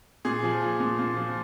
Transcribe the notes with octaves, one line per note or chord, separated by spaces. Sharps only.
A#2 G#4
F3
F3
A#2
A#2
F3